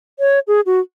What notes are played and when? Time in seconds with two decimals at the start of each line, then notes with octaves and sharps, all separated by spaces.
0.19 C#5
0.48 G#4
0.66 F#4